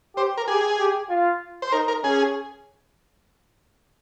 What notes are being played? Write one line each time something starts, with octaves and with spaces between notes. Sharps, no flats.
G4 C5
A#4
G4 G#4
G4
F4
C5
D#4 A#4
A#4
C#4 G#4